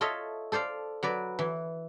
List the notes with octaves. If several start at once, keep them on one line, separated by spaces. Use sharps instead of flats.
F4 A4 C#5 D#5 E5
A4 C5 D5 F5
F#3 B4 D5
E3